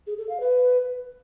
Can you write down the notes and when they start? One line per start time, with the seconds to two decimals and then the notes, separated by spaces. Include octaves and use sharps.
0.07 G#4
0.18 A4
0.29 F5
0.40 B4